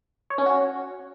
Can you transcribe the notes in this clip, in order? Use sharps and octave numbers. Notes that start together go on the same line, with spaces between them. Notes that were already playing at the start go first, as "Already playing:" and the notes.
C#5
C#4
F#4